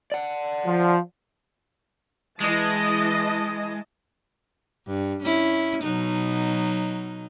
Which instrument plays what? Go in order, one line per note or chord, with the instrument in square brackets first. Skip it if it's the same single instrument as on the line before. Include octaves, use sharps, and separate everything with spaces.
[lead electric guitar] D5 F#5
[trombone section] F3
[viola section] E3 D#5 A5 [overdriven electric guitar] G#3
[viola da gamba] G2
C#4 E4
B2 F#3 D#4